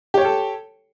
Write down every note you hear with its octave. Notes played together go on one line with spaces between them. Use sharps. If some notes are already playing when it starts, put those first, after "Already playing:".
G4 A4 C#5 G5